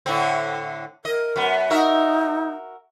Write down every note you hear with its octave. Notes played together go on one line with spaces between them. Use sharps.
A2 D3 C4
A#4 D#5
F#2 B3
D#4 F#4 A#4 E5